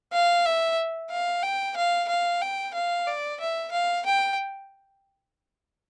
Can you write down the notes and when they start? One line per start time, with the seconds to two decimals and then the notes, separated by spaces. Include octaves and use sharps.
0.13 F5
0.46 E5
1.11 F5
1.43 G5
1.76 F5
2.09 F5
2.41 G5
2.74 F5
3.07 D5
3.40 E5
3.72 F5
4.06 G5